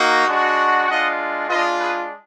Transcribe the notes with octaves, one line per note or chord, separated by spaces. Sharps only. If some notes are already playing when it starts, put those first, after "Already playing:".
Already playing: A#3 D#4 F#4
G#3 D4 F#4
G#3 D4 F4 D#5 F#5
G#3 D4 F4 B4 D#5
G#4 B4